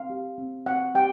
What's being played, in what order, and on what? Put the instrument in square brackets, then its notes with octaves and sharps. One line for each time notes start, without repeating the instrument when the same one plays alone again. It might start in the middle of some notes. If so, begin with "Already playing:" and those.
Already playing: [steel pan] C4 F5
G4
C4
C4 F#5
G4 G5